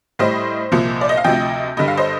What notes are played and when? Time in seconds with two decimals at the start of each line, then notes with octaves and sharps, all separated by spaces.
0.19 A2 G3 C5 D#5
0.72 C2 A#2 F3
1.01 D5
1.09 D#5
1.17 F5
1.24 D2 C3 F3 D#5 G5
1.77 G2 D3 G3 D#5
1.88 F5
1.97 C5 D#5